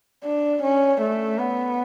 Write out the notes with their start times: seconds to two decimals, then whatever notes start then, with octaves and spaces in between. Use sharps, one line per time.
0.25 D4
0.63 C#4
1.01 A3
1.39 B3